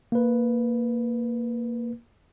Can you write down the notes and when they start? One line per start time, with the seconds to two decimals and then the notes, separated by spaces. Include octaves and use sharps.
0.12 A#3 B4